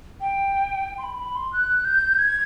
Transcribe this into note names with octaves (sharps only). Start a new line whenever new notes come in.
G5
C6
B5
B5
C6
F#6
G6
G#6